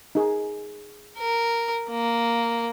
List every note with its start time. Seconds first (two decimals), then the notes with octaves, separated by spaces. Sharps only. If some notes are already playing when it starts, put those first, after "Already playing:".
0.15 D#4 G#4
1.18 A#4
1.90 A#3